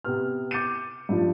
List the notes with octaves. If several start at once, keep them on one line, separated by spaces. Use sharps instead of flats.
C3 B3 F6
D6 G6 A6 C#7 D#7
G2 F3